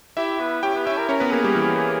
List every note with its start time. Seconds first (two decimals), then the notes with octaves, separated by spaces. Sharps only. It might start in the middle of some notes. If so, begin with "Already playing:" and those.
0.17 E4 G4 E5
0.40 B3
0.63 C#4 G4 G5
0.75 B3
0.86 C#4 E4 E5
0.98 A#4
1.09 C#4 A#4 C#5
1.20 B3 B4
1.32 A#3 G#4 A#4
1.44 G3 G4
1.55 E3 E4